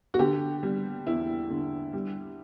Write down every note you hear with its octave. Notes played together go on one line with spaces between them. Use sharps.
F#4
D3 G4
G3
E2 E4
D3
G3